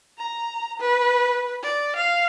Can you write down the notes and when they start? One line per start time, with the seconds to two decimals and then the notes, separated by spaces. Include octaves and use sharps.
0.18 A#5
0.80 B4
1.63 D5
1.96 F5